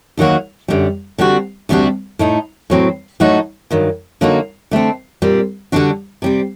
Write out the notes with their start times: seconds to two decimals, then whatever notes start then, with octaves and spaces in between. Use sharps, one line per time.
0.17 D#2 D#3 F#3 A#3 F#4
0.68 F#2 D3 G3
1.18 D3 G3 C4 F#4
1.69 D2 C3 G3 D4 F#4
2.19 A2 A3 D#4
2.70 A2 F#3 C4
3.20 A2 F#3 A3 D#4 F#4
3.70 G2 D#3 F#3
4.21 D3 F#3 A#3 D#4 F#4
4.71 D3 A3 C4
5.22 A#2 G3 C4
5.72 D3 G3 D4 F#4
6.22 C3 G3 C4